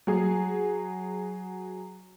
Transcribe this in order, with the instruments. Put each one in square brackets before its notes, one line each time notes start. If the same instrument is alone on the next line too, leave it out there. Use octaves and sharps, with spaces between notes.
[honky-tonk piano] F#3 G#4